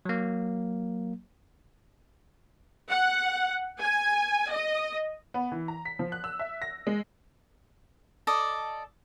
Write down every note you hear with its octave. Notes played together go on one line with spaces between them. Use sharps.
F#3 A#3
F#5
G#5
D#5
B3
E3
A#5
B6
F3
F#6
E6
E5
A#6
G#3
A4 D5 D#5